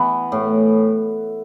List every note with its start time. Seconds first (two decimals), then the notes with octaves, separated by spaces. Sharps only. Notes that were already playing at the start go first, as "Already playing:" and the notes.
Already playing: E3 B3
0.32 A2